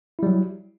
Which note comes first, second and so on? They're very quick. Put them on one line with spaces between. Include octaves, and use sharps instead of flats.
E4 G3 F#3